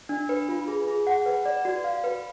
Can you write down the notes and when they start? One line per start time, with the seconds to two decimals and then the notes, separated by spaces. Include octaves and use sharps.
0.09 D4
0.29 B4
0.49 F4
0.68 G#4
0.87 G#4
1.07 F#5
1.26 B4
1.45 D5
1.65 F#4
1.84 F5
2.04 B4